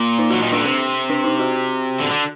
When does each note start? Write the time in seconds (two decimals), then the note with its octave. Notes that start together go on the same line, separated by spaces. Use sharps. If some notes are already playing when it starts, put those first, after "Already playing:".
Already playing: A#2
0.19 D#4
0.30 F#3 F#4
0.42 D#3 A#3
0.53 D3 D4
0.64 C3 C4
1.10 D4
1.24 D#4
1.39 F#4
2.00 D3
2.11 D3